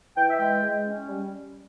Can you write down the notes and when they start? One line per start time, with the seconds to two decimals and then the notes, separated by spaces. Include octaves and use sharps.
0.16 E3 G5
0.29 E5
0.39 G#3 G5
0.63 G#3
0.85 C#4
1.08 G3